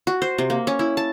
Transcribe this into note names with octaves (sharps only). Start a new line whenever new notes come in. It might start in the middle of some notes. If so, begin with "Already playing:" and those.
F#4
C5
C3
A#3
C#4
E4
A5